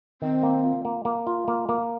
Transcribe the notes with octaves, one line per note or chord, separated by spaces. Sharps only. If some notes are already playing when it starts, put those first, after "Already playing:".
D#3 C4
A#3
F4
A#3
A#3
F4
A#3
A#3